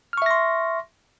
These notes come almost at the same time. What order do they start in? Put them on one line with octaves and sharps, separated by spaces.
F6 C#6 E5 A#6 C6